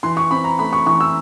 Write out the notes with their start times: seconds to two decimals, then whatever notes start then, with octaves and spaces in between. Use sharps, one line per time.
0.03 E3 C6
0.17 C#6
0.31 C4 B5
0.44 A#5
0.59 A3 B5
0.73 C#6
0.87 E3 C#6
1.01 E6